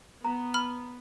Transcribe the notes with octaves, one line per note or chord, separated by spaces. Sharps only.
B3 A#5
B5 F6